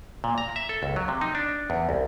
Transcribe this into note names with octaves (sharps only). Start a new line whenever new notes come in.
A#2
A#5
E5
A4
C#2
F#3
C3
D#4
D4
E2
C2